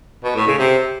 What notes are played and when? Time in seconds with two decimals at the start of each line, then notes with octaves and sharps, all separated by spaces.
0.24 B2
0.36 A2
0.47 C#3
0.59 C3